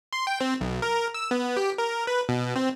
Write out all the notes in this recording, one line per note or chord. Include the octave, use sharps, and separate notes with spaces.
C6
G5
C4
B1
A#4
E6
B3
G4
A#4
B4
B2
C4